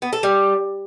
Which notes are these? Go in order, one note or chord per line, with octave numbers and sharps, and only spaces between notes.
B3
A4
G3